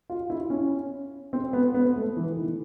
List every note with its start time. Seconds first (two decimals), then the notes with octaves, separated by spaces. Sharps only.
0.10 F4
0.30 E4
0.50 C#4
1.33 C4
1.53 B3
1.74 B3
1.96 A3
2.16 E3
2.37 D#3